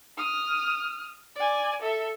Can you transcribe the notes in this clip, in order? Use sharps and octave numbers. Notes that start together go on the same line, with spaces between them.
D#6 F6
D5 G#5
A4 E5